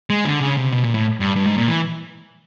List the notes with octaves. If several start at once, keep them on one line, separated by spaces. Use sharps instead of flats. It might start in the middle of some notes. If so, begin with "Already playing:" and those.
G#3
D3
C#3
C3
B2
A#2
A2
G2
G2
G#2
A#2
E3